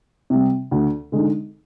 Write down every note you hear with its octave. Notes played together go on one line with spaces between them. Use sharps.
C3 G3
D2
D3 G#3 D#4